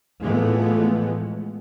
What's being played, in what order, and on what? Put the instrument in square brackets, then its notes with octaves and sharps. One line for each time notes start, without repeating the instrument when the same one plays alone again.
[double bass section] A2 E3 F3 G#3 A3 B3